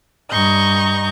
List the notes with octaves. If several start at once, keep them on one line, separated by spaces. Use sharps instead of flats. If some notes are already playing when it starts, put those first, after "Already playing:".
G2 D#5 A#5 C#6 G6